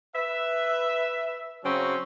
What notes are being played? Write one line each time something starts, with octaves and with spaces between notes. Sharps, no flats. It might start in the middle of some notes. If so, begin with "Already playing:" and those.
B4 E5
C#3 F#3 C4 C#4